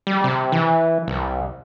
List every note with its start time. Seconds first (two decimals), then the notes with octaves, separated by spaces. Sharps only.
0.07 G3
0.24 C3
0.52 E3
1.08 C2